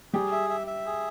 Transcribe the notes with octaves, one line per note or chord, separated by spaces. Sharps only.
G3 G4 G#4
E5
E5
E5
G#4